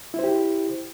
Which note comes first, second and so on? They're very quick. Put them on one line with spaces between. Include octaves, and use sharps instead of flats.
E4 C5 G4